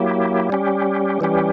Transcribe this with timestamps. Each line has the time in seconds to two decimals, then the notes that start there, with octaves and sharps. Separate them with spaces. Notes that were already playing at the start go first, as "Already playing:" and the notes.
Already playing: F#3 A#3 E4 G4
0.50 G3 C#4 G4
1.21 E3 G3 C#4 G4